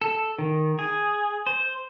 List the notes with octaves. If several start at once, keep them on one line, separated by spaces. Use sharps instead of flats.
A4
D#3
G#4
C5